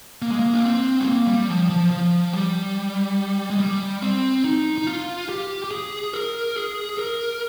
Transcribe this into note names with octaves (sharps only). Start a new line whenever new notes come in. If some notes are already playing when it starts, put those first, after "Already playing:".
A#3
G#3
A#3
D4
C4
G#3
A#3
G3
F3
F3
F3
G3
G#3
G3
C4
D#4
D#4
F4
G4
G4
G#4
A#4
G#4
A#4